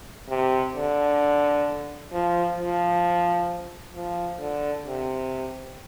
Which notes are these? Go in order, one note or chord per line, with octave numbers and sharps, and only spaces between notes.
C3
D3
F3
F3
F3
D3
C3